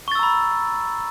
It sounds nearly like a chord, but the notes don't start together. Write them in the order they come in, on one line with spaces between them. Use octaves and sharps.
C#6 A6 E6 A#5 B5